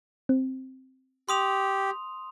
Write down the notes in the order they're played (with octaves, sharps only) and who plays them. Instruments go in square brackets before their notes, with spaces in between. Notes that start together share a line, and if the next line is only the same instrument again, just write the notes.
[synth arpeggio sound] C4
[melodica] G4 [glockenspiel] C6 D#6 F7